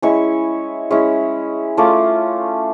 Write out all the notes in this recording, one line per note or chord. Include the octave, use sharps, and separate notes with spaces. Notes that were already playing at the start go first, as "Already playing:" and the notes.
G#3 C#4 E4 C#6
G#3 C#4 E4
A3 C#4 F4 D6